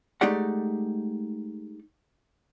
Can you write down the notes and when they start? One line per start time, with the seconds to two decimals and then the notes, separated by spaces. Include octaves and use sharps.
0.21 G#3 A3 D#4 G4 D5 F#5